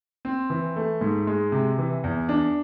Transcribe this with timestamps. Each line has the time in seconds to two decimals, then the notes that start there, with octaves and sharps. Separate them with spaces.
0.25 C4
0.50 E3
0.76 A3
1.01 G#2
1.27 G#3
1.52 C3
1.78 E3
2.04 E2
2.29 D4